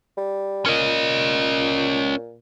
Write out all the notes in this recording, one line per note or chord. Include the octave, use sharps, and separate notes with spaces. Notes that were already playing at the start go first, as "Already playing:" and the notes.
G3
A#2 C#4 D#5